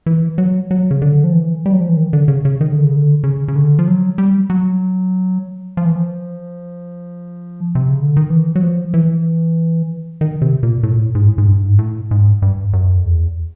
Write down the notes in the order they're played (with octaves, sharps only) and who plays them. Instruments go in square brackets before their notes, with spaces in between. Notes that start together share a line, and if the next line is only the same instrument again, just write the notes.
[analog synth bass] E3
F#3
F#3
C#3
D3
F3
E3
G3
F#3
F3
E3
D#3
D3
C#3
C#3
D#3
D3
C#3
D3
C#3
C#3
D3
F3
F#3
G3
F#3
F3
E3
F3
C3
C#3
D3
D#3
E3
F#3
F3
E3
D#3
C3
A#2
A2
A#2
A2
G#2
A2
G#2
G2
G#2
A2
G#2
G2
F#2
F2
E2